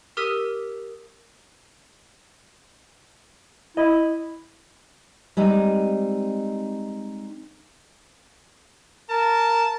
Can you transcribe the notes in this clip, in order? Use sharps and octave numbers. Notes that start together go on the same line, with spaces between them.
G4 A#4 D#6 E6 B6 D#7
E4 D#5
G3 G#3 C4 D#4
A#4 A5